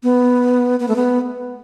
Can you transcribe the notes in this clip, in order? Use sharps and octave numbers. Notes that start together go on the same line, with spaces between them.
B3
B3
A3
B3